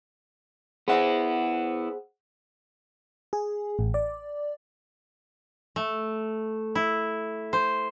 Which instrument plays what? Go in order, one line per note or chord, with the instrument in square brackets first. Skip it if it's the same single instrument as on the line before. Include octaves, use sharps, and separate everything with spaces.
[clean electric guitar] B3 E4 [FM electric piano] G#4 C5 F#5
[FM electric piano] G#4
A1
D5
[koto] A3
E4
C5